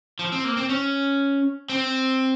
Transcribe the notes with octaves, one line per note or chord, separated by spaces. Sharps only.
F3
C4
A#3
C4
C#4
C4